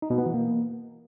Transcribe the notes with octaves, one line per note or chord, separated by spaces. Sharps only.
D#4
B2
B3
E3
A#3